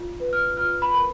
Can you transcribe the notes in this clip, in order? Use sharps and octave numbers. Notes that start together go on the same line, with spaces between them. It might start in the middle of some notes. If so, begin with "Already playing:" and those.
Already playing: F4
B4
F6
F4 F6
B5
A#4